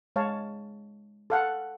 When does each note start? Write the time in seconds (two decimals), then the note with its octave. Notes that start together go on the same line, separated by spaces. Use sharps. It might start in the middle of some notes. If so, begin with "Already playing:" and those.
0.16 G#3 C#5 F5 A5
1.30 A4 F5 F#5